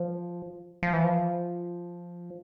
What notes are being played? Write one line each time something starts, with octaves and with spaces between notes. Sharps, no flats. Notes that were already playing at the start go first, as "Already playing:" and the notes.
Already playing: F3
F3
E3
F3